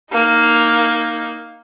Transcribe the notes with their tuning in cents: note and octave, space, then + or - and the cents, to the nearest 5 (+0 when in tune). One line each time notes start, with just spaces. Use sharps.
A#3 +0 D#4 +0